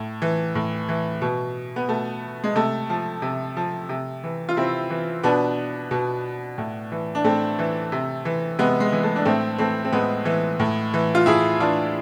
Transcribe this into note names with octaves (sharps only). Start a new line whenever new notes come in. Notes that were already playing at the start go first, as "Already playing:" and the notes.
Already playing: A2
E3
A2
E3
B2
B3
B2 A3
G#3
C3 A3
F3
C3
F3
C3
E3
F4
C3 C4 E4
E3
B2 B3 D4
B2
A2
E3
D4
A2 A3 C4
E3
C3
E3
C3 G#3 B3
G#3
E3
A3
D4
A2 A3 C4
E3 A3 C4
C4
A2 G#3 B3
E3
A2
E3
F4
A2 E4 G#4
E3 D4 F4